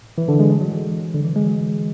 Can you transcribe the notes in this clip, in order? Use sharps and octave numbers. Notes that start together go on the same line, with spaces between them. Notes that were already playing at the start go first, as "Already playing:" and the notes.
E3
D3
G#3
G#3
F#3
E3
D3
E3
G#3
F#3